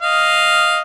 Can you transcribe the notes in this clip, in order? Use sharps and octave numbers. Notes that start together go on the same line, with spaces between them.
D#5 F5